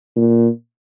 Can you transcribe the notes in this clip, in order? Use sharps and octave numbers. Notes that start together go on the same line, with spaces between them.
A#2